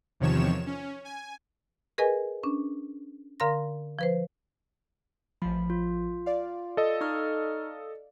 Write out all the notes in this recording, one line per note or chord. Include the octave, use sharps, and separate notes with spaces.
E2 C3 D#3 F3 C#5 E7
C#4
G#5
G#4 A#4 B4 D#5 G#5
C#4 D4
D3 A#4 F5 A#5 C6 A#6
F3 B4 C5
A1 F3 B5
F4
D5 F5
A4 D#5
D#4 C#6 F6